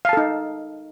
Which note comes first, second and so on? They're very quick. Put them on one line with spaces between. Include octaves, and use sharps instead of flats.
F5 A5 A4 D#4